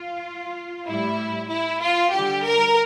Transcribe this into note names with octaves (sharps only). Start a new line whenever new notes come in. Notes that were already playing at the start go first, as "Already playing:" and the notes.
Already playing: F4
A2 G3 E4
E4
F4
D3 G3 G4
A#4